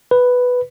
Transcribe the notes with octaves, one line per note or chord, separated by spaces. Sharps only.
B4